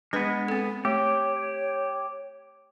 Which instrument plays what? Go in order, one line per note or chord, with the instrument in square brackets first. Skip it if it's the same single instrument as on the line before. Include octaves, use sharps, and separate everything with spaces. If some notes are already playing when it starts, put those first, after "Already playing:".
[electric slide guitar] G#3 B3 [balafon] D4 B4 D#5
[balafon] C4 A4
[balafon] A3 [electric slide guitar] G4 [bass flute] C#5